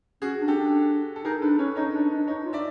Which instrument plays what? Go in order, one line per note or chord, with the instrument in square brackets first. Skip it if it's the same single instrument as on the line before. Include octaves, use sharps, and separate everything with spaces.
[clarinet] C#4 [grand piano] F#4 G#4
[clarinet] D4
[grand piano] G4 A4
[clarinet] D4
[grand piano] A4
[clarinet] D#4 [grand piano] G#4 A#4
[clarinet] D4 [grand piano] A4 B4
[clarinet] C#4 [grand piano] B4 C#5
[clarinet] D#4 [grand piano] C#5 D#5
[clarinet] D4
D4
[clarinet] D#4 [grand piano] C#5 D#5
[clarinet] F4
[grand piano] D5 E5